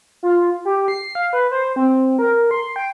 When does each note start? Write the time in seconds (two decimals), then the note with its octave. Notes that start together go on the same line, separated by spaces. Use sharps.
0.23 F4
0.65 G4
0.88 C7
1.15 F5
1.33 B4
1.51 C5
1.76 C4
2.19 A#4
2.51 C6
2.76 G5